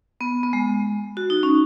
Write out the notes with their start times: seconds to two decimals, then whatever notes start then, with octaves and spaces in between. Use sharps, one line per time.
0.21 B3
0.43 B3
0.53 G#3
1.17 F#4
1.30 D#4
1.43 C#4